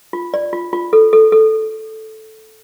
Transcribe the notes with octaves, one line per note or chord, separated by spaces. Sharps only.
F4
D5
F4
F4
A4
A4
A4